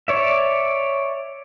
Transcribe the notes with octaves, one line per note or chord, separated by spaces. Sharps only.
C#5 D5 E5